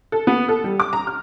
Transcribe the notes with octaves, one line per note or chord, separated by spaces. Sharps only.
A4
B3
A4
G3
D6
A#5
F6